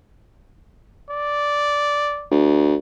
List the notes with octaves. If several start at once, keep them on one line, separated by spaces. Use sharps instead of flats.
D5
D2